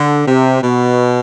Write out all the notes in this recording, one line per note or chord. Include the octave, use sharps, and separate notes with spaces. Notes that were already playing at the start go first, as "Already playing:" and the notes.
Already playing: D3
C3
B2